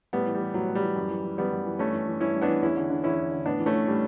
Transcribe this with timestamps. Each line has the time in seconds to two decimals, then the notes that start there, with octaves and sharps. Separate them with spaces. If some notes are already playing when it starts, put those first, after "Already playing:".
0.13 A2 G3 B3
0.26 E3
0.35 G3
0.40 E3
0.54 A2 F#3
0.69 A2
0.75 G3
0.83 E3
0.96 F#2
1.10 E3
1.25 E3
1.38 F#2 G3 B3
1.52 F#2
1.66 E3
1.79 G2 A3 C#4
1.93 E3
2.08 E3
2.20 G2 C#4 E4
2.35 G2
2.41 B3 D4
2.48 E3
2.62 E2 C#4 E4
2.76 D3
2.90 D3
3.04 E2 C#4 E4
3.18 E2
3.32 D3
3.45 A2 B3 D4
3.59 E3
3.66 A3 C#4
3.74 E3
3.88 A2 G3